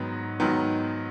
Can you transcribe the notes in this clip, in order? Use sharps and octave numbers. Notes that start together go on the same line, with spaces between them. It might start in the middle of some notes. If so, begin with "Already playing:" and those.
Already playing: G#2 D#3 F#3 B3
G#2 D#3 F#3 B3